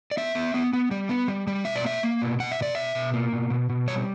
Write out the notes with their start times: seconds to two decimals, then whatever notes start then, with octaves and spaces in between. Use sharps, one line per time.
0.11 D5
0.17 B3 E5
0.35 B3
0.54 B3
0.73 B3
0.91 G3
1.09 B3
1.28 G3
1.47 G3
1.65 B2 E5
1.76 D5
1.84 A#3 E5
2.03 A#3
2.22 B2
2.40 B2 F#5
2.51 E5
2.59 B2 D5
2.75 B2 E5
2.95 B2
3.14 A#3
3.33 B2
3.50 B2
3.70 B2
3.88 G3 C#5